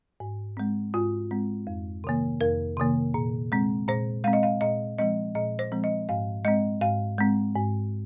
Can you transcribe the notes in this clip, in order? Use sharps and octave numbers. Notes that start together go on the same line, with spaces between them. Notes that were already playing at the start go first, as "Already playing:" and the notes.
G#2
G#3 C4
G#2 F4
G#3 C4
F2
C3 D#3 A#3
F2 A#4
C3 D#3 A#3
A#2
G#3 C4
A#2 C5
G#3 C4 F5
D#5
F5
A#2 D#5
F3 G#3 C4 D#5
A#2 D#5
C5
F3 G#3 C4
D#5
G#2 F5
G#3 C4 D#5
G#2 F5
G#3 C4
G#2